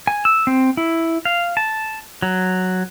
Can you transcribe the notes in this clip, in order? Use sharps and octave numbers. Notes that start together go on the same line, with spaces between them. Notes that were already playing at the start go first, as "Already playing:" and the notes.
G#5
E6
C4
E4
F5
A5
F#3